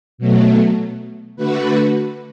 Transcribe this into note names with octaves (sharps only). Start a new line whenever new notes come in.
B2 F#3 A3
D3 A3 F#4 B4